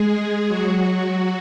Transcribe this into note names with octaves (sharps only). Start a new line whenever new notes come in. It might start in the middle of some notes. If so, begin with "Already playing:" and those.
Already playing: G#3 G#4
F#3 F#4